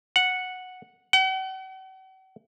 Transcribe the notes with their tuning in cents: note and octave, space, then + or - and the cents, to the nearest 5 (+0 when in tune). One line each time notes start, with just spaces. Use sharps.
F#5 -5
F#5 +45